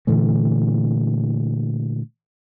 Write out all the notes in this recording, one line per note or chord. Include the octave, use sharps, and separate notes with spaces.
A#2 D3 E3 A3